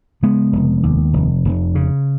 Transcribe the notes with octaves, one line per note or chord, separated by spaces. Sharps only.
C#3 G#3 B3
F1
D#2
F1
F1
C#3